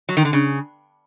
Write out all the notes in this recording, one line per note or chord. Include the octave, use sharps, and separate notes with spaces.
F#3
D#3
D3
C#3